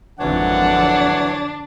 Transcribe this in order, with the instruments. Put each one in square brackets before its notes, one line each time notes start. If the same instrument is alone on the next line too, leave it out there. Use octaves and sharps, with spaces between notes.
[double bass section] G#1 F2 D3 [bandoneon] E3 F#3 C#5 [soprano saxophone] D4 [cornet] F#5